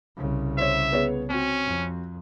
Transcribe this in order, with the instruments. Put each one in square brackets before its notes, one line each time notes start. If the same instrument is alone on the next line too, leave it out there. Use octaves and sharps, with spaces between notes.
[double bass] C2 C#3
[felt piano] C5 C#5 [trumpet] E5
[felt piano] B3 G#4 C#5
[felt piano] C4 F#4 [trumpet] C#4
[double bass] F2